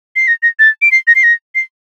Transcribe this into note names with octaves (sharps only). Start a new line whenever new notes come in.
C7
A#6
A#6
A6
D7
C7
A#6
C7
A#6
C7